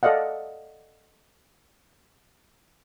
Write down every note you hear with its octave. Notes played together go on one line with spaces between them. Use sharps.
A4 D5 D#5 F5 F#5